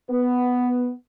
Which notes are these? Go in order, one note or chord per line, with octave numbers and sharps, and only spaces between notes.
B3